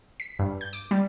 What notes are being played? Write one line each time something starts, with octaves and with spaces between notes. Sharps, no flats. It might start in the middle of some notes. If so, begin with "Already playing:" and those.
B6
G2
G6
D6
G3